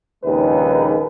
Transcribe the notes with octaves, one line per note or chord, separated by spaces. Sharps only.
A#1 D#2 C#3 G#3 D#4 B4